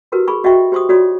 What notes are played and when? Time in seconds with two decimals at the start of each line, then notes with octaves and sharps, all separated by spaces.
0.12 E4 F#4 G4 A#4 B4
0.28 G#4 B5 C#6
0.44 F#4 D#5 E5 G5 C#6
0.72 G4 C5 C6 C#6 D#6
0.89 F4 F#4 C#5 D5 C6 D#6